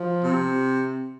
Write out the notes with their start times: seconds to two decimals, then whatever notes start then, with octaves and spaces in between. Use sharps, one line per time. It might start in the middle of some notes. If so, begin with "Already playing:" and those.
Already playing: F3
0.23 C3